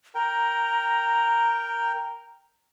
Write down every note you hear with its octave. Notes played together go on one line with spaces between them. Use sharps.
A#4 G5 A#5